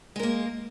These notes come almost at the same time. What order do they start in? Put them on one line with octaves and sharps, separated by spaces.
G#3 A#4 A#3